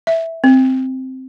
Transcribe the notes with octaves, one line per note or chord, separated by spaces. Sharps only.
E5
C4